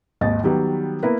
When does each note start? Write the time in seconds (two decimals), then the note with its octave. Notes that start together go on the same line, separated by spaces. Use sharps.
0.21 G#1 D#2 D#5 A6
0.43 D#3 F#3 G3 B3
1.03 A#3 B3 E4 A#4 B4